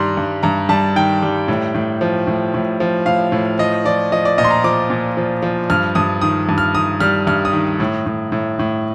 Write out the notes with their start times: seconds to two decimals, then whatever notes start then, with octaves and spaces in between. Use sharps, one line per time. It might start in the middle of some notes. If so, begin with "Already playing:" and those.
Already playing: G2 D#3 G3 A#5 C6
0.17 G2
0.43 G2 A#5
0.69 G3 A5
0.96 D#3 G5
1.22 G3
1.48 A2
1.74 A2
2.01 F3
2.27 A2
2.54 A2
2.80 F3
3.06 A2 F5
3.32 A2
3.59 F3 D#5
3.85 F3 D5
4.12 F3 D#5
4.25 D5
4.38 A#2 D#5
4.44 C6
4.50 A#5
4.64 F3 D6
4.90 A#2
5.17 F3
5.43 F3
5.70 G2 F6
5.95 G2 D#6
6.21 D#3 D#6
6.49 G2
6.58 F6
6.75 D#3 D#6
7.00 G3 F6
7.27 G2 F6
7.45 D#6
7.53 D#3
7.80 A2
8.06 A2
8.32 A2
8.59 A2